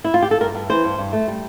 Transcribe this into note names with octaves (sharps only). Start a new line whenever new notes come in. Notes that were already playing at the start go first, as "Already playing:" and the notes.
E4
F4
G4
A4
G2 A#4
G2
E3 C5
G2
G2
A3
G3